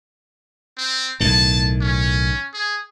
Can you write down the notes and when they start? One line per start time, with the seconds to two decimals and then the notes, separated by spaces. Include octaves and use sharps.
0.77 C4
1.20 B1 A2 D#3 A5
1.81 C#4
2.54 G#4